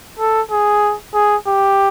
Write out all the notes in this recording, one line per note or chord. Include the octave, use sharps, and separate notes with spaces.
A4
G#4
G#4
G4